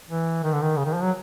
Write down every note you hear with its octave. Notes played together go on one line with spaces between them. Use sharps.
E3
D#3
D3
D#3
C#3
D#3
F3
F#3